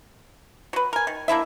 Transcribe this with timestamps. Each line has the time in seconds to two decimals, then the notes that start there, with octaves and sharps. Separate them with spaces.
0.73 F#3 B4
0.93 A#4 G#5
1.07 D#3
1.28 A#3 D4 E4 E5